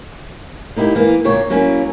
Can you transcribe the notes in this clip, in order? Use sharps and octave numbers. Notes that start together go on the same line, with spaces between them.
A#3 D#4 E4 G4
E3 A#3
D2 A#2 A#3 C#5
F#3 A#3 C#4 E4